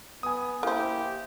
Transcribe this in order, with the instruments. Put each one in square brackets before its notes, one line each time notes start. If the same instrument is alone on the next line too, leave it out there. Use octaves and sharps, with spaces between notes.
[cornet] B3 [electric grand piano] G#5 D#6
[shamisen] A#3 C5 [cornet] E4 [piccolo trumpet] G4